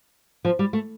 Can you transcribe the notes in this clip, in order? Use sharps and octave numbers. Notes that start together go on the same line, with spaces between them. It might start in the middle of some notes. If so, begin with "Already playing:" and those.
F3
G3
A3